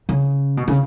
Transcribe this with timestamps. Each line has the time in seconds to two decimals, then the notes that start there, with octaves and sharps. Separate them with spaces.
0.09 C#3
0.57 B2
0.68 C#3